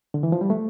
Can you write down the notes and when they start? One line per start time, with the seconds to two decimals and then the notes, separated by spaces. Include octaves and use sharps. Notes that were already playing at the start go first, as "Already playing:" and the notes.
0.14 D3
0.23 E3
0.32 F3
0.41 G3
0.50 A3